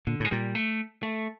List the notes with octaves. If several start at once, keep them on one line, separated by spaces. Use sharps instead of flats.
A#2 D3
A2 G#3
A#2 G3
A3
A3